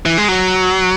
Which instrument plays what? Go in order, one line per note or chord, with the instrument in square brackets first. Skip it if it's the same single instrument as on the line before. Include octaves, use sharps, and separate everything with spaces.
[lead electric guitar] E3
G#3
F#3